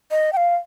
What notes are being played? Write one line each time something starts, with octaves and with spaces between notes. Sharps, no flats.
D#5
G5
F5